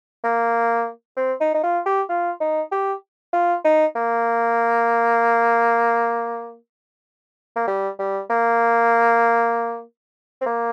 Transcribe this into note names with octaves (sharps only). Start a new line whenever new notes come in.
A#3
C4
D#4
D#4
F4
G4
F4
D#4
G4
F4
D#4
A#3
A#3
G3
G3
A#3
C4
A#3